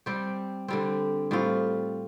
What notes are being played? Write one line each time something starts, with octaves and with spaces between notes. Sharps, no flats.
G3 C4 G4
D3 G3 C4
A2 G3 C4 F4